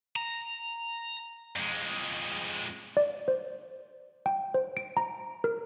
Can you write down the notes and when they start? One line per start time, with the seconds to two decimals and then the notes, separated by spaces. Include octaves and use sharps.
0.16 A#5
1.56 F2 G#3
2.97 D5
3.28 C5
4.26 G5
4.54 C5
4.77 D7
4.97 A#5
5.44 A#4